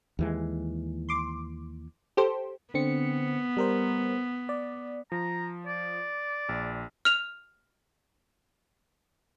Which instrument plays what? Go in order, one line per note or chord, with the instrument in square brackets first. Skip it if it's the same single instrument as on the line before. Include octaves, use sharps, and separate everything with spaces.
[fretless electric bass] D#2 E3 G#3
[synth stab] C6 D6
G4 A4 C5
[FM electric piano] D3 C4 C#7 [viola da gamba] B3
[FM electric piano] G3 A#4 C5
D5
[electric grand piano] F3 [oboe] A#5
[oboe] D5
[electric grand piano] A#1
[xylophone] F6 F7